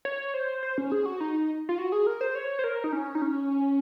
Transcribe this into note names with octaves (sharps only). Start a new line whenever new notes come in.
C#5
C5
C5
C#4
G#4
F#4
D#4
F4
F#4
G#4
A#4
C5
C#5
C5
A#4
D#4
C#4
D#4
C#4